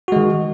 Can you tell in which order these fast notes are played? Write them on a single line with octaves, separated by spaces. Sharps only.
F#4 G#3 D#3